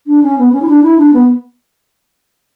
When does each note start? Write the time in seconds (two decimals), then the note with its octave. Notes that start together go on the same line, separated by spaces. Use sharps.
0.07 D4
0.23 C#4
0.38 B3
0.52 C#4
0.61 E4
0.68 D4
0.82 E4
0.97 D4
1.13 B3